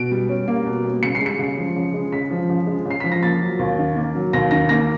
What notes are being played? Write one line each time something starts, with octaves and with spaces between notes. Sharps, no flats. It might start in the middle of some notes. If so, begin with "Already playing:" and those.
Already playing: B2 D7
G3
C#4
A#3
B2
G3
C#3 C#7
C7
G#3
C#7
C#3
F3
C#3
G#3
C#3 B6
F3
C#3
G#3
C#3
C7
F3 B6
A#6
A#3 A6
F#3
D#2
D#3
A#3
F#3
D#2 A#6
D#3 A#6
A#3 A#6